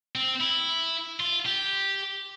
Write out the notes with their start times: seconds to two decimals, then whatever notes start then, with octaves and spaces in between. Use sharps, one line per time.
0.16 C4
0.41 E4
1.20 F4
1.45 G4